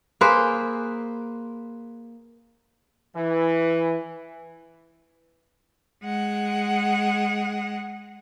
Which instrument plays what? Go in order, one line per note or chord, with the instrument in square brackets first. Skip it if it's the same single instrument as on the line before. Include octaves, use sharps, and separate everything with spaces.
[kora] A#3 G#4 B4 C5
[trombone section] E3
[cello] G#3 F#5